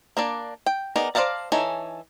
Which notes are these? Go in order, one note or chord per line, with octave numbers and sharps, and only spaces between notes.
A#3 D4 D5
G5
B3 D#4 G#4 A#4 D5
C5 D5 F5 A5 A#5
E3 D#4 A4 C#5 G#5